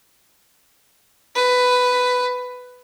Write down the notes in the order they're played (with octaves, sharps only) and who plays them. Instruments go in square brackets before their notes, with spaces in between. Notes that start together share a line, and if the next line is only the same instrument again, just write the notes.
[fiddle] B4